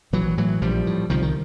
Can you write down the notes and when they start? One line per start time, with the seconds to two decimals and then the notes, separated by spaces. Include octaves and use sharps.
0.13 A#1 E3 F#3
0.38 A2 E3 F#3
0.62 A#1 F3 G3
0.87 A2
1.10 C2 D#3 F3
1.22 D#3